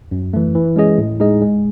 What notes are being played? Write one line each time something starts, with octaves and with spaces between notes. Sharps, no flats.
F#2
E3 A3
E3
G#3 C#4 G#4 D#5
A2
G#3 D#4 G#4 D#5
G#3